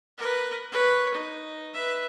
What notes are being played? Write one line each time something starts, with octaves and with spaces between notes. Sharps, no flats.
A#4 B4
B4 C#5
D#4
B4 E5